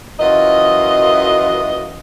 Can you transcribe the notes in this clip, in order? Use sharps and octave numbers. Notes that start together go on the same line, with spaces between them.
F#2 E3 F4 D#5